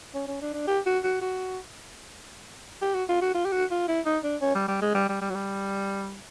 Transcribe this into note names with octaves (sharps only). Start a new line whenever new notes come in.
C#4
C#4
D4
D4
G4
F#4
F#4
F#4
G4
F#4
F4
F#4
F4
G4
F#4
F4
E4
D#4
D4
C#4
G3
G3
G#3
G3
G3
G3
F#3
G3